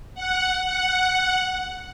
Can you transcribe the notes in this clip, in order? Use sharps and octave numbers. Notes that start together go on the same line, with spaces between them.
F#5
F#5